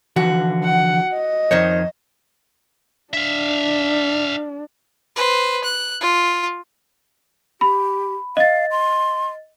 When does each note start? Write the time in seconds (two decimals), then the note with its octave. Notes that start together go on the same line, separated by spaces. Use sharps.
0.16 D3 E3 F3 F#4
0.64 F#5
1.13 D#5
1.51 F2 D#3 C5 C#5
3.14 D4 E5 F5
5.16 B4 C5
5.64 F#6
6.01 F4
7.61 G4 B5
8.37 D#5 F5 A6
8.71 C6